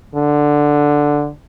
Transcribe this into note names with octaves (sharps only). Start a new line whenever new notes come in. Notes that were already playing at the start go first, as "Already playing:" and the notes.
D3